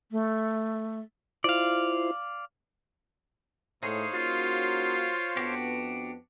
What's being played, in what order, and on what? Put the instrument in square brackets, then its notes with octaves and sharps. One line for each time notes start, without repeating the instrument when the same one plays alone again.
[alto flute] A3
[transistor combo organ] E4 F4 C5 [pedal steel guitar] D5 F5
[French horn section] A2 [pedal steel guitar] D#4 G#4 [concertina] C5 C#5 F5
[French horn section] A#3 C#4 F#4 [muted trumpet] F4
[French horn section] F2 B3 [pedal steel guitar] D4 F#4 G4